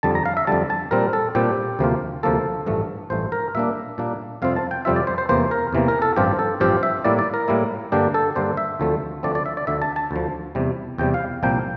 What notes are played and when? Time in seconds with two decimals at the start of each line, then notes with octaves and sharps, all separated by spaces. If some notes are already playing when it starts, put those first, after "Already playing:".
0.03 F2 D3 G3 A5
0.15 A#5
0.26 F5
0.37 E5
0.47 F2 D3 G3 A5
0.70 A5
0.91 A#2 G3 C4 A#4
1.13 A4
1.35 A#2 G3 C4 G4
1.79 D2 C3 F3 A#3 F4
2.23 D2 C3 F3 A#3 F4 A4
2.66 A1 G2 F3 A3
3.10 A1 G2 F3 A3 C5
3.32 A#4
3.55 A#2 G3 A#3 D4 E5
3.98 A#2 G3 A#3 D4
4.42 F2 C3 G3 C4 F4 F5
4.56 A5
4.71 G5
4.85 F2 C3 G3 C4 F4 E5
4.96 D5
5.07 C5
5.18 C5
5.29 E2 C3 E3 A#3 C5
5.51 A#4
5.73 E2 C3 E3 A#3
5.88 A#4
6.02 A4
6.16 A1 G2 F3 C4 F4 G4
6.39 A4
6.60 A1 G2 F3 C4 F4 G4
6.83 E5
7.04 A2 G3 A#3 E4 D5
7.19 D5
7.34 A#4
7.48 A2 G3 A#3 E4
7.92 G2 D3 G3 A#3 D4 G4
8.14 A4
8.36 G2 D3 G3 A#3 D4 C5
8.57 E5
8.80 D2 D3 F3 A3 C4
9.23 D2 D3 F3 A3 C4 D5
9.35 D5
9.46 E5
9.57 D5
9.67 D2 D3 F3 E5
9.82 A5
9.96 A5
10.11 D2 D3 F3
10.55 E2 C3 G3
10.98 E2 C3 G3 G5
11.14 F5
11.43 C2 A#2 F3 A#3 G5